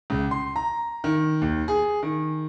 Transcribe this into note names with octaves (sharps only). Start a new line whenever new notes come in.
C#2
C6
A#5
D#3
D#2
G#4
D#3